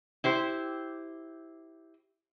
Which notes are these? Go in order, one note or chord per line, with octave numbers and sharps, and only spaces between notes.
E4 G4 C5